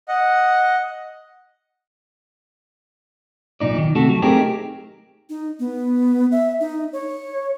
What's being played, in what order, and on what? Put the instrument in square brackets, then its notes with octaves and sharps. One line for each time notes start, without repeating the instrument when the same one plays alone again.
[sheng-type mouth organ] D#5 F#5
[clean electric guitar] B1 A#2 D#4 D5
D#3
C3 A3 F#4 A4
F#3
A3 C4 D#4 G4 G#4 A#4
[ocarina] D#4
B3
E5
D#4
C#5